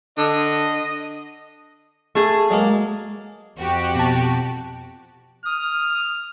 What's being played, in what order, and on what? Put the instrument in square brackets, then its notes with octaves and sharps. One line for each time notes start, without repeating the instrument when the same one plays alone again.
[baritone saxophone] D3 [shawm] D#5
[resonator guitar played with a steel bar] A3 G#4
[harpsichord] F#3 G#3 A#3
[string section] F2 F#4 G4
[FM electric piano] B2 A5
[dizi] D#6 [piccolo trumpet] F6